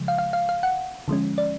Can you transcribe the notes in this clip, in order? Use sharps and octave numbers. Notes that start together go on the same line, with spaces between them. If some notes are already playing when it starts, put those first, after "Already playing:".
Already playing: C#3 F3 G#3
F5
F5
F5
F5
F#5
D3 F3 G#3 C#4
D5